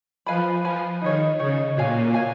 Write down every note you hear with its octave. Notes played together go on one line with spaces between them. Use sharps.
F3 B4 F5 G#5 B5
F3 B4 F5 G#5 B5
D#3 D#4 G#4 C#5
C#3 D#4 G#4 C#5
A#2 F#4 C#5 F5 G#5
F#4 C#5 F5 G#5